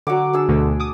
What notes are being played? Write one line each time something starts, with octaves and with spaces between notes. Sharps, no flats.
D3 F#3 F#5 D6
D4 G#4 E6
D2 B2 D3
D6 D#6